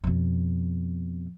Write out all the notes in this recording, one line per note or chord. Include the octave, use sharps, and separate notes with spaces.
F2 B2